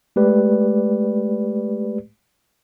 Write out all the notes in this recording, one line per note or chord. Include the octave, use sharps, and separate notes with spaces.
G#3 A3 G4 B4 D5